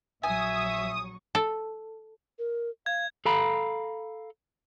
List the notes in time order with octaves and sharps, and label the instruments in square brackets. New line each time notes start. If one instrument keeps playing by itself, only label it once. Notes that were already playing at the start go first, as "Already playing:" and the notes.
[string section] A#1 F#3 C#6 [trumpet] E5 [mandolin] G#5 [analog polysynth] D#6
[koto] A4
[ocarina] A#4
[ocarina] F5 [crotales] G#6
[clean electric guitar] A4 F5 A#5 B5